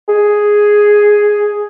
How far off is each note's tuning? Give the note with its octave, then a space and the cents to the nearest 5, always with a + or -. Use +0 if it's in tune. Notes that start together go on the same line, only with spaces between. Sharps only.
G#4 +0